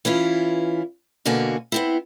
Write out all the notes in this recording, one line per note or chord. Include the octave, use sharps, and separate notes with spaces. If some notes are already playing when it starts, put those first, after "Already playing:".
E3 C#4 E4 F4
B2 D3 A#3 F#4 G#5
B3 C4 E4